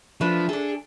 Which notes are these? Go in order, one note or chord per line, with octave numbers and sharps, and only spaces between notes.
F3 A3 D4 B4
D4 G#4 A4